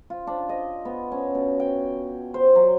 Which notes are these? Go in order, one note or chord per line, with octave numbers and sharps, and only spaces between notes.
F4
D4
D#5
B3
C#4
B2
G5
C5
F#3